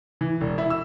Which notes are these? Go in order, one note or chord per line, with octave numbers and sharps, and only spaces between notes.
E3
E1
E4
E6